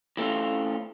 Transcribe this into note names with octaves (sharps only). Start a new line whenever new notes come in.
E3 A3 C4 C#4 F4